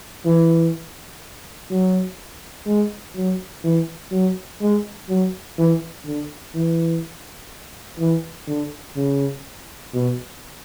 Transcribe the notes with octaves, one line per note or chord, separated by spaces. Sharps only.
E3
F#3
G#3
F#3
E3
F#3
G#3
F#3
E3
D3
E3
E3
D3
C#3
B2